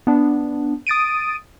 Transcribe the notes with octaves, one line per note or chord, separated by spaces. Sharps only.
B3 D4
D#6 A6 D7 D#7